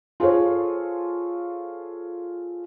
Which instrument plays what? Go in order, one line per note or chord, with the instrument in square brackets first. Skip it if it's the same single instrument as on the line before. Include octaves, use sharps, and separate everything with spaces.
[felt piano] F4 G#4 A4 C5 C#5